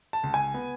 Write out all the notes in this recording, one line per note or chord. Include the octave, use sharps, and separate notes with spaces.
A5
C#2
G#5
B3